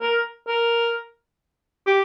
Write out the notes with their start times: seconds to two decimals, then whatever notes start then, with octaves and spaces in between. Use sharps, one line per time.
0.01 A#4
0.47 A#4
1.87 G4